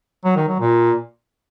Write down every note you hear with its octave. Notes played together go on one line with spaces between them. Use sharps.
F#3
D#3
F#3
A#2